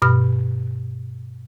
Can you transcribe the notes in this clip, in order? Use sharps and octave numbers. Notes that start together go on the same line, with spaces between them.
G2 B2 B5 F6